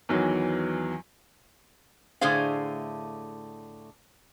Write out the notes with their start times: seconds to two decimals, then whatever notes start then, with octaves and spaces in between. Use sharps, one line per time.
0.09 E2 D#3 E3 F#3
2.21 A2 D3 A3 G#4 C5 F5